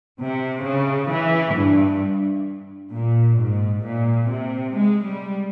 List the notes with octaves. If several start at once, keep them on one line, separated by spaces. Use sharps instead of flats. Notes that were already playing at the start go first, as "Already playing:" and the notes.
C3
C#3
E3
G2
A#2
G#2
A#2
C3
G#3
G3